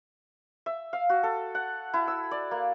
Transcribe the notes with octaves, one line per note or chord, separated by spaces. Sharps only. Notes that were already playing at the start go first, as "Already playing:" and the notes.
E5
F5
F#4
A4
F#5
E4
E6
D5
A#3